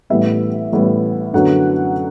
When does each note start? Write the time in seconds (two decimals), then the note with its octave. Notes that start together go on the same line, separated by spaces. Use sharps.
0.10 A1 A2 G3 B3 E5
0.72 A1 A2 G3 B3
1.33 F#2 D3 F#3 B3 F#5